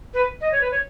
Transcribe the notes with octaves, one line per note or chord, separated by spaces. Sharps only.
B4
D#5
C#5
B4
C#5